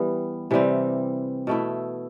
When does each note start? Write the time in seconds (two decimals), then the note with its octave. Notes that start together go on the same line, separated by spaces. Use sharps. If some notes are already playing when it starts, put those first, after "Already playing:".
Already playing: E3 G3 B3
0.51 C3 E3 G3 C4
1.47 B2 A3 E4